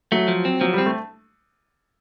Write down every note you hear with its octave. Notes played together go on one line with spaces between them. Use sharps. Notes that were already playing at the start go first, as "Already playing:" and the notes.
F#3 A3
F3
C4
F3 F#3
G3 C4
A3